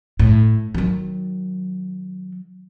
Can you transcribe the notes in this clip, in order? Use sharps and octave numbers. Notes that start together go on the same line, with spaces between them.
A2
D#3 F#3